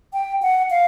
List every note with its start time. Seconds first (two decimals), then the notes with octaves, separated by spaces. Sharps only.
0.13 G5
0.42 F#5
0.70 F5